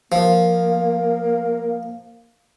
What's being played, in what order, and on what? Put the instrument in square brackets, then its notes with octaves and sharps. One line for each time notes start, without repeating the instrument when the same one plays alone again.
[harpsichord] F3 [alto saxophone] A#3